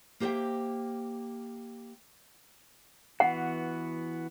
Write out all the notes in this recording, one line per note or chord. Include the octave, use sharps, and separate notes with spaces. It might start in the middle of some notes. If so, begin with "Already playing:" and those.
A#3 G4 C5 D#5 E5 G5
E3 B3 F#4 F#5